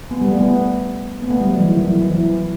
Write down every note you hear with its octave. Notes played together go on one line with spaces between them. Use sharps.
B3
G3
A3
B3
B3
A3
G3
F#3
E3
D#3
E3
F#3
E3